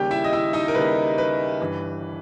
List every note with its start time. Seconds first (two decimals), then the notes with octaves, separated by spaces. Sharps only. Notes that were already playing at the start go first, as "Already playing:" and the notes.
Already playing: D#2 C#3 G3 G4 G5
0.11 E4 E5
0.24 D#5
0.33 E4 E5
0.53 D#4 D#5
0.68 A#4
0.75 D#2 C#3 G3 B4
1.18 B4
1.61 G1 G2 E3